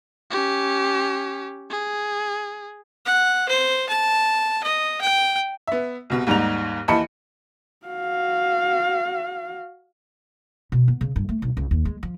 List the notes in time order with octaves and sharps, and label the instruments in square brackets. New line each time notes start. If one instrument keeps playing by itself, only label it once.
[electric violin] C#4 G4
G#4
[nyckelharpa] F#5
C5
A5
D#5
G5
[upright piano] B3 E5
C2 B2
D#2 G#2 G3 D#4 F7
D#2 E3 D#5 A5 B5 C#7
[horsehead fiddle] F#4 F5
[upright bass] B2
B3
C#3
G2
A3
B1
C#2
D#2
G#3
F3